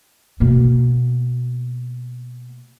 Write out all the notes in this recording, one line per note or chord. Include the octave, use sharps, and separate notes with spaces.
B2 A#3